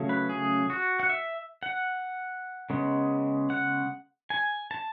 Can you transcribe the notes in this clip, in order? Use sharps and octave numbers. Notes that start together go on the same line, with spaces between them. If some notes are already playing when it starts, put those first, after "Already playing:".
Already playing: C#3 F#3 A3 C#4
B4
G#4
F#4
F#5
E5
F#5
C#3 G#3 B3
F#5
G#5
A5